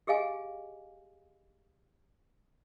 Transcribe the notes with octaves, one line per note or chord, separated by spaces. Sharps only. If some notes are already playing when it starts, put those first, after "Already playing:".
G4 G#4 D#5 F5 G#5